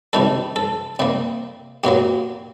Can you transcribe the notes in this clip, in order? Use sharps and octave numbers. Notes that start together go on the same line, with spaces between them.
C3 D#3 G3 A4
A4
C3 G3 A#3
A#2 F#3 A#3 G4